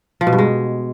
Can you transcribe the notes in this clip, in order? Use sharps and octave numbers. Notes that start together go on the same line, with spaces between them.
F3
B2
G2
G#3